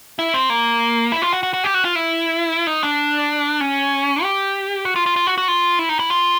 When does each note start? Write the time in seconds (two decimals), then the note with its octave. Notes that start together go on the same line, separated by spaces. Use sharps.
0.19 E4
0.34 C4
0.50 A#3
1.12 E4
1.22 F4
1.33 F#4
1.43 F#4
1.54 F#4
1.64 G4
1.74 F#4
1.85 F4
1.95 E4
2.67 D#4
2.83 D4
3.61 C#4
4.23 G4
4.85 F#4
4.96 F4
5.06 F4
5.16 F4
5.27 F#4
5.38 F#4
5.48 F4
5.79 E4
5.89 D#4
6.00 E4
6.10 F4